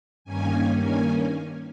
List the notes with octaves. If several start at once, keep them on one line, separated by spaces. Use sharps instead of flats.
G2 D#3 A#3 C#4 G#5
G#5